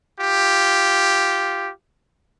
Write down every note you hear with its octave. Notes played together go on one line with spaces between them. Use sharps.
F4 G4